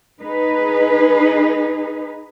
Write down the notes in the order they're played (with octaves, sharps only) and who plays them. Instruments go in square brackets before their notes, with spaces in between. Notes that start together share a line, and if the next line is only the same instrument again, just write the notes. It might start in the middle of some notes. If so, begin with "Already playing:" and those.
[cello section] D#4 G#4 B4